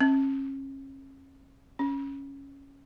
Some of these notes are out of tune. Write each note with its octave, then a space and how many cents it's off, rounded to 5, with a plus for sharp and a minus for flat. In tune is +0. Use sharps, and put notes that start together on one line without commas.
C#4 -35
C#4 -5